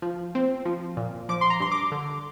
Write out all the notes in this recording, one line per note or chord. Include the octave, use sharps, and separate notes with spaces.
F3
C4
F3
A#2
F3 D6
C6
A#5
G2 C6
D6
D3